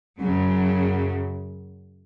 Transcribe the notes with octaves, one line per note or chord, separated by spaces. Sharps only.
F#2 C#3 F#3